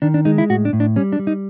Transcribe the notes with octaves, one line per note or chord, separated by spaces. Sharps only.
D#3 D4
D4
G#3 D#4
E4
A2 F#4
D4
A2
D4
G3 C#4
D4
G3
D#4